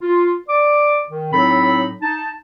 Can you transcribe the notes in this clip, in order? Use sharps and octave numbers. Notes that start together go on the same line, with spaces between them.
F4
D5 D6
D#3
A2 F#3 C4 D#4 A4 B5
D#4 A5